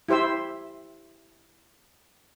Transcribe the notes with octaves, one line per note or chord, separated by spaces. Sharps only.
E4 G4 C5 E5 E6